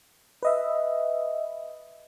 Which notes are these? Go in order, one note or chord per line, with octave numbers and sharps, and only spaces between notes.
B4 D#5 E5